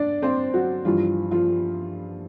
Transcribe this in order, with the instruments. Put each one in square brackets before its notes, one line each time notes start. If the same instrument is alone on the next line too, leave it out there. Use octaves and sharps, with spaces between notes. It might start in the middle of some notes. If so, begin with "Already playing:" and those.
Already playing: [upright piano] D4 D5
C4 C5
F#3 F#4
G2 E3 F3 G3 F4
F3 F4